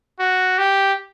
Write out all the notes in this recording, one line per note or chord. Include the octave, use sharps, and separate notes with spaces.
F#4
G4